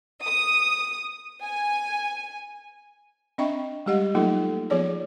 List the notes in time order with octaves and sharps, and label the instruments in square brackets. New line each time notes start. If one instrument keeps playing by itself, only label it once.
[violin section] D#6
G#5
[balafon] C4 D4 D#5 E5 G5 C#6
G3 G#3 G4 D#5 F#5
F#3 A3 A#3 D#4 F4 A4
F3 B3 F4 G#4 C#5 D5